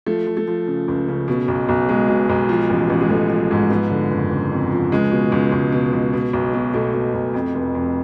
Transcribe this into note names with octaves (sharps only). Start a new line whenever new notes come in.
F3 A3
F3
A3
F3
C#3
C#2
C#3
B2
B1
B1
B2 G#3
B2
B1
F3
A1
A1
G#3
A1 A3
F3
G#2
F3 B3
D3
F#1
F#1
F2
F3
C#2 G#3
B2
C#2
C#2
B2
C#2
B2
B1
B2
B2 A3
B2
B1
F2
F1
F2